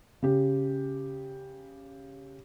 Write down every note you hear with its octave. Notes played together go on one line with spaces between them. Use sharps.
C#3 G4